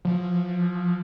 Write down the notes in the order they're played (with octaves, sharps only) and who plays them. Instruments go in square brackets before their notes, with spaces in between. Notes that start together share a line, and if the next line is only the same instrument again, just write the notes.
[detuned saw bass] F3